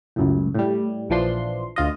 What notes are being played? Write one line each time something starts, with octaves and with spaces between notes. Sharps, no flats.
C#2 F#2 A2
A2 G3
A#1 E3 F3 D4 C6
D2 F4 D#5